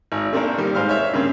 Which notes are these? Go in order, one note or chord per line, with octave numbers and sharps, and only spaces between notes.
G#1
A3 A#3 C4 D4 A4 A#4
D#3 G3 A#3
G#2 C5 F5 F6
C#5 E5
G2 C#3 A#3 C4